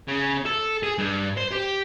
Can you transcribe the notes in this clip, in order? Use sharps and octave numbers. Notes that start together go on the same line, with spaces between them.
C#3
A4
G#4
G2
C5
G4